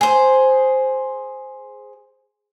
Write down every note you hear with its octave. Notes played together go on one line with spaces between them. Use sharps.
G#4 C5